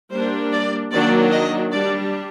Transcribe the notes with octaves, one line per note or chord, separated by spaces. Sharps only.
G3 A#3 D4 C5
D5
D#3 F#3 A#3 D4 D5
D#5
G3 D4 D5